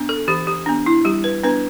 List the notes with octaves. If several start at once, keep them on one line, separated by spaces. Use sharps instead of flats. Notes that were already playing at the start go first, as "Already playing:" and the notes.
Already playing: B3 D4
A4
E3 G4
G4
B3 D4
E4
G3 G4
B4
B3 D4 B4